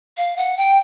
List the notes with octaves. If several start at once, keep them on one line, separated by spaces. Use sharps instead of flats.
F5
F#5
G5